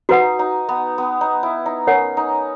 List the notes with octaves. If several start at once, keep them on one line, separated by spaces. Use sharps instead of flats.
D#4 F#4 B4 F#5
D#4
B3
B3
D#4
E4
D#4
C#4 A#4 C#5 F#5
D#4